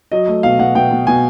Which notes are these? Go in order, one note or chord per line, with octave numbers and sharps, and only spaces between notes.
F#3 D#5
A3
B2 F5
B2 F#5
B2 G5
B2
B2 G#5